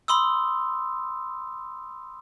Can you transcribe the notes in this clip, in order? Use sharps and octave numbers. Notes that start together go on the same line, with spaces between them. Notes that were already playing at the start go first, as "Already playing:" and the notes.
B5 C6 D#6 E6